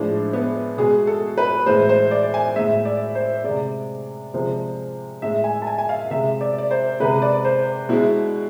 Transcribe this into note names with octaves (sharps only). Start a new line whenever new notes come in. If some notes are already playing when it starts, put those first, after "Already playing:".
Already playing: A2 F3 G#3 D4
B3
B2 G#3 G#4
A4
B4
A2 E3 G#3 C5
C5
D5
G#5
A2 G#3 E5
D5
C5
C3 G#3 D5
C3 F3 G#3
A2 G#3 E5
G#5
A5
G#5
G#5
F5
C3 G#3 E5
D5
D5
C5
C3 G#3 B4
D5
C5
B2 G#3 E4